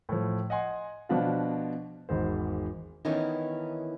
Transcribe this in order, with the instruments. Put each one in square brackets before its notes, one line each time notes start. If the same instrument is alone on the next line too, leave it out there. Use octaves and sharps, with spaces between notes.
[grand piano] A2 F3
D#5 F#5 G#5 C6
B2 F3 B3 D4 F4
G#1 E2 G#2 C5
[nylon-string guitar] D#3 E3 B3 C#4 D#4 E4